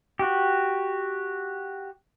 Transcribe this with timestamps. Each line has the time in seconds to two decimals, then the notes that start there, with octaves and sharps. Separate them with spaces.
0.19 F#4 G4